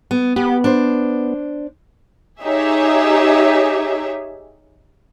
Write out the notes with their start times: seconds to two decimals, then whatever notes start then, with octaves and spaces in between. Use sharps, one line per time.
0.11 B3
0.36 B3 G4
0.64 D4 C5
2.42 D#4 G4 G#4 C#5 E5